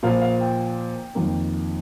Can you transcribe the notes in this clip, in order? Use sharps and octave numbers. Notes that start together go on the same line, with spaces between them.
A#2 F3 A#3 F5
F5
G5
F2 D#3 A#3